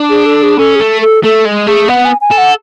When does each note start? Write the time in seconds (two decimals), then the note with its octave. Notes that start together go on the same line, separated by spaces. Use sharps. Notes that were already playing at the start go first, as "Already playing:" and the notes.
Already playing: D4
0.09 G#4
0.26 A4
0.43 G#4
0.58 C#4 A4
0.75 G#4
0.80 A3 A4
1.01 A4
1.23 A3 A4
1.45 G#3
1.67 A3 G#4
1.88 B3 F#5
2.05 G#5
2.21 G#5
2.31 A4
2.38 F#5